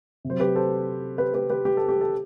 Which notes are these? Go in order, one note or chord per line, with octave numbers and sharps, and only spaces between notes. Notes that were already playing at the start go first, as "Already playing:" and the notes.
C3
F#3 C5
G4 B4
A4 C5
G4 B4
G4 B4
G4 B4
G4
A4
G4
A4